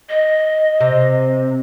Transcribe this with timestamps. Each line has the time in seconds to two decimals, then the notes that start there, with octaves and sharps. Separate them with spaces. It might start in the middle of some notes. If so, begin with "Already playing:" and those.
0.10 D#5
0.80 C3